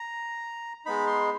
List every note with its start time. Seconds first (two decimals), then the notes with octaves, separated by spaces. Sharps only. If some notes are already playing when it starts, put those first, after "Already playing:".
Already playing: A#5
0.86 G#3 B3 D#4 B5
1.07 C6